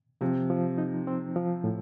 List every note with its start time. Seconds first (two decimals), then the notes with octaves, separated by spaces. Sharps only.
0.21 C3 F3
0.50 F3
0.78 D#4
1.07 C4
1.36 F3
1.64 A2